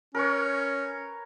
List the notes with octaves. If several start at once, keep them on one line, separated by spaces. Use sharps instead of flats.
C#4 A#4 B4 C#5